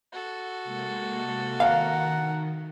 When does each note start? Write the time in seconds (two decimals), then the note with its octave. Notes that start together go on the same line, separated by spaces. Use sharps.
0.12 F#4 A4
0.64 C3 G#3 A#3
1.60 D#3 A#4 F5 F#5